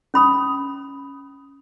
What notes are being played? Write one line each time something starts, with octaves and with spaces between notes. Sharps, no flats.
C#4 B5 D#6